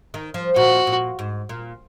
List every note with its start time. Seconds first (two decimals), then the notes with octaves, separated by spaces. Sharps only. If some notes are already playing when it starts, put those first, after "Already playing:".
0.14 D#3
0.34 F3
0.56 A#2 F#4
0.87 A#2
1.19 G#2
1.49 A#2